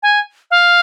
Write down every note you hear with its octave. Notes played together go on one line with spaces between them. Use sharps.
G#5
F5